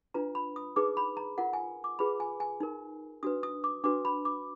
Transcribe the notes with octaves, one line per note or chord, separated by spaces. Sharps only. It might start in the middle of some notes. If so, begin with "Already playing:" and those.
D4 F4 B4 A#5
B5
D#6
D#4 G#4 B4 D6
B5
A#5
F4 A#4 F#5
G#5
D6
F4 G#4 B4 B5
G#5
G#5
D#4 A#4
D4 F#4 B4 D#6
D#6
D6
D4 F#4 B4 D6
B5
D6